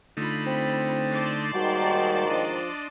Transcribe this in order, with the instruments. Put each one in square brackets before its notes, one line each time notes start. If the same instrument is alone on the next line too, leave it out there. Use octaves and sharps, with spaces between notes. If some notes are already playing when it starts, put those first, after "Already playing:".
[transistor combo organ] D3 A3 D#4 [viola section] F4 B5
[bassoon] C4
[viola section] D5 A5 C6
[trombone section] D#2 G#2 D#3 [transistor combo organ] G3 [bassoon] F#4
[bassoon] F3 [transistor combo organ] D4 D#5